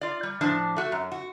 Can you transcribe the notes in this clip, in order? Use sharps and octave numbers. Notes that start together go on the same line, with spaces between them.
F4 D5
G3
A2 F3 D4 A5
A3 F#4
F#2
F#4